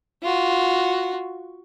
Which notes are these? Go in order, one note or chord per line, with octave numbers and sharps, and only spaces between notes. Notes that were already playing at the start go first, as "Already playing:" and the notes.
F4 F#4